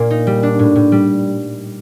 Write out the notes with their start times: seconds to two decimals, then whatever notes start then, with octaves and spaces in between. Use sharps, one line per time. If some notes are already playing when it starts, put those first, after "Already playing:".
Already playing: A#2 A#3
0.10 D#4
0.27 G3
0.43 D4
0.59 A2
0.76 A2
0.92 G3